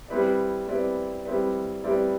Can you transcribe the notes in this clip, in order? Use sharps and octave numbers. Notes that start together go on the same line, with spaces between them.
G3 C4 E4 B4 D5
G3 C4 E4 B4 D5
G3 C4 E4 B4 D5
G3 C4 E4 B4 D5